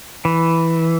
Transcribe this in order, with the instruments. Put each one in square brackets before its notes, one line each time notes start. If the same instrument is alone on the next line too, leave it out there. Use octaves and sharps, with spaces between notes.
[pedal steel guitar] E3